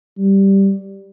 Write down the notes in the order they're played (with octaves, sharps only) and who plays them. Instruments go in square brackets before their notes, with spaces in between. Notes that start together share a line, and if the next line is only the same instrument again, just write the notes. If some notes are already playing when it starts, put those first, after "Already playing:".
[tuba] G3